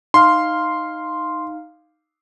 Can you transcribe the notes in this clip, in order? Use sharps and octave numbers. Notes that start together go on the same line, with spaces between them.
D#4 F5 C6 F6